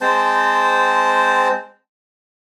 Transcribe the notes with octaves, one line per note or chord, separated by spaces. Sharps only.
G#3 C4 C5 A5